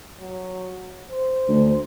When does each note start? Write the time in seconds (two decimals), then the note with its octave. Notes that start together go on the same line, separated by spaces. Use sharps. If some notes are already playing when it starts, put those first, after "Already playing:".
0.20 F#3
1.10 C5
1.48 D2